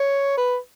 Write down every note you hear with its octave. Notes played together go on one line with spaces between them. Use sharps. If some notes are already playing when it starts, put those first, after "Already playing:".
Already playing: C#5
B4